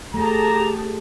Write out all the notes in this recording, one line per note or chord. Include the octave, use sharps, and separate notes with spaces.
A3 G4 G#4 A5 A#5